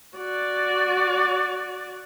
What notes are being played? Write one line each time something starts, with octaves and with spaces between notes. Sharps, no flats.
F#4 D5